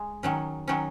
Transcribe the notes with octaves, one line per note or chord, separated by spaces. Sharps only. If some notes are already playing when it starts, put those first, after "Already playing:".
Already playing: G#3
D#3 F#3 C#4
D#3 F#3 C#4